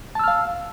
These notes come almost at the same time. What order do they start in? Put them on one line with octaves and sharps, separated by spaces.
A5 E6 F6 F5